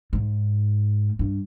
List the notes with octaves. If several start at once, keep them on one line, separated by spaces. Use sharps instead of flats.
G#2
G2